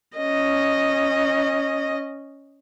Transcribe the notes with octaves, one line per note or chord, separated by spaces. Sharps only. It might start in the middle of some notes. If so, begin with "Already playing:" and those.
C#4 D#5